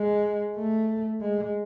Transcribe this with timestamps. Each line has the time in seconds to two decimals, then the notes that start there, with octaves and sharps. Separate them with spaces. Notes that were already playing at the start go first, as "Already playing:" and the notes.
Already playing: G#3
0.57 A3
1.22 G#3